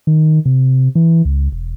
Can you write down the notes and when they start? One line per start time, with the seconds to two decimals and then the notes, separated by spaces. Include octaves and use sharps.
0.07 D#3
0.45 C3
0.95 E3
1.25 C#2
1.52 E1